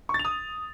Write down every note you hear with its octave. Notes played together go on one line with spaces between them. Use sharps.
C#6
A6
F7
D#6